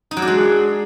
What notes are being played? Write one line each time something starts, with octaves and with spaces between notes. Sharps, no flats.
D#4
F#3
D4
G#3